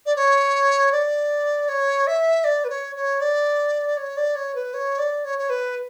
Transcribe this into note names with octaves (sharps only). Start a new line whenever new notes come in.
D5
C#5
D5
C#5
E5
D5
B4
C#5
C#5
D5
C#5
D5
C#5
B4
C#5
D5
C#5
C#5
B4